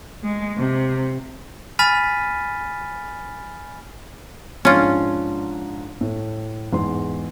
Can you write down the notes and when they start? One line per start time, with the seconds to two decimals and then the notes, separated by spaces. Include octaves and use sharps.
0.23 G#3
0.57 C3
1.79 G#5 B5 F6 A6 B6 D#7
4.65 G#2 F3 C#4 D4 F4
6.01 A2
6.73 E2 G#2 C6